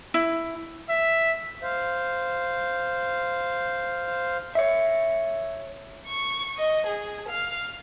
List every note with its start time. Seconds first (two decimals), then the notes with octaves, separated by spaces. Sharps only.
0.14 E4
0.89 E5
1.63 C5 F5
4.55 C#5 E5
6.06 C#6
6.58 D#5
6.87 G#4
7.29 F5